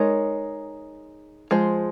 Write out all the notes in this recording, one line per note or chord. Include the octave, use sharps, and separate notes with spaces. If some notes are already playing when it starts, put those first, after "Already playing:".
Already playing: G#3 D#4 A#4 C#5
F3 G#3 C5